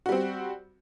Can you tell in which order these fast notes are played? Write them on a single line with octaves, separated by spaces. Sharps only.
F#4 G3 C4